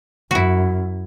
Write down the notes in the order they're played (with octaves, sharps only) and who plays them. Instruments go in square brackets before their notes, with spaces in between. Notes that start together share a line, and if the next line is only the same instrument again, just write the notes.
[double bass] F#2 [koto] E4 F#4